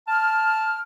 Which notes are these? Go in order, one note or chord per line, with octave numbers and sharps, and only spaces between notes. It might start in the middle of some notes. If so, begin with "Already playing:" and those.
A5 F6